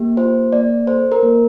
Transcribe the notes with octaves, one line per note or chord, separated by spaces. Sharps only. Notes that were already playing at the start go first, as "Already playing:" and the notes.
Already playing: A#3 G4
F4 C5
A#3 D5
A4 C5
A#4
A#3